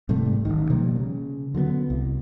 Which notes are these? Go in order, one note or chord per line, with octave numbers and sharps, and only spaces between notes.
G#2 C3 G3 A3
D1 A1 D#2 D#3
B2 F3 G3 A#3
C#3
D3 F#3 A#3 B3
C2